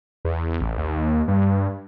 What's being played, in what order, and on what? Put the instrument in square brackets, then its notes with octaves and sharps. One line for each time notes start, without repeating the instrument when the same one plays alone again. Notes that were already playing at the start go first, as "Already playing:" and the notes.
[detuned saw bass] E2
A1
D#2
G2